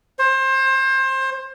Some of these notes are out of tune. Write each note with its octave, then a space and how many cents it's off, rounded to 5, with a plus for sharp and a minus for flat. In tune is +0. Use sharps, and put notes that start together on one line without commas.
C5 +25